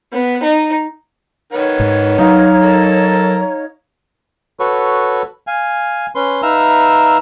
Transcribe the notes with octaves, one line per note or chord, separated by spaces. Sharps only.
B3
D#4
D#3 B4 C#5 F#5
G#2
F#3 D#4 F5
A4 A#4
F#4 A4 B4 C#5
F5 G#5
C#4 B4 C6
D#4 B4 E5 F5 A#5 E6